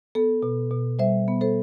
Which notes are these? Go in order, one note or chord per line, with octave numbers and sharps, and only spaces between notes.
B3 A4
B2
B2
G3 C5 E5
B3
A4 C5